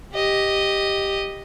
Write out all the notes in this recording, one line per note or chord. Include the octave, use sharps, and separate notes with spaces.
G4 D#5